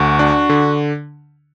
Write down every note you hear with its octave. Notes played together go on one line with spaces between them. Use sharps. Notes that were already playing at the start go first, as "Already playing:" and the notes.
Already playing: D2 F#4
D4
D3